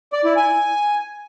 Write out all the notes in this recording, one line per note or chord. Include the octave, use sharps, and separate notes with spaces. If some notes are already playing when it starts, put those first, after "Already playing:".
D5
E4
G#5